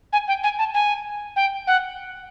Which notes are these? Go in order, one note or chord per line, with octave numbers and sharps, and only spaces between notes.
G#5
G5
G#5
A5
G#5
G5
F#5